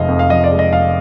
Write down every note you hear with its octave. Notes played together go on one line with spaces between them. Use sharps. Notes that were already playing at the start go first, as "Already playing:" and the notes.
Already playing: F1 F3 G#3 D#5 F5
F2
F5
F3 D#5
D5
G#3
D#5
F1 F5